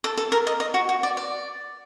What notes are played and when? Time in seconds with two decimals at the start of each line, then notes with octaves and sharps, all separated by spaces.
0.04 A4
0.17 A4
0.32 A#4
0.47 D#5
0.60 D#5
0.74 F#4
0.89 F#4
1.03 D5
1.17 D5